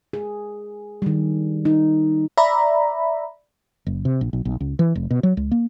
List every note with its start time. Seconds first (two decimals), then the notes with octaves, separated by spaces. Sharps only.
0.13 G#4
1.02 D#3 G3
1.65 D#4
2.37 D5 E5 A#5 B5
3.86 F#1
4.05 C3
4.21 A#1
4.33 B1
4.45 B1
4.60 C#2
4.79 E3
4.95 F1
5.11 B2
5.23 F#3
5.37 C#2
5.51 A#3